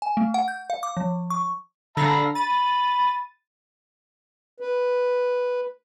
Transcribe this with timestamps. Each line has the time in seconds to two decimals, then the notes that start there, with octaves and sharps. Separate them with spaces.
0.02 G#5
0.17 A3
0.34 F#5
0.48 G6
0.70 F5
0.83 D6
0.97 F3
1.30 C#6
1.97 D3 A4 F5 A#5 B5 A#6
2.35 B5 A6 D#7
4.60 B4